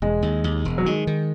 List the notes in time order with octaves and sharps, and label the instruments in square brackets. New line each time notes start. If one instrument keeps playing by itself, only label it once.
[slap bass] E1 [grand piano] G#3
[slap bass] D#2
D#2
E1
[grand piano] F#3
[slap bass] D#3 [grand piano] G#3
[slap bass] D#3